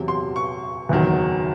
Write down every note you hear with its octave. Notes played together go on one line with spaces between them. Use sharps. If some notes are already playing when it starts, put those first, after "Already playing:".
Already playing: E2 C3 F#3
C6
C#6
F#1 E2 D#3 F#3